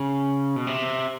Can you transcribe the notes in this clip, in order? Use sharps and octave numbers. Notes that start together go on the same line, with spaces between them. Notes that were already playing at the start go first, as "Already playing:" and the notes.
Already playing: C#3
B2
C3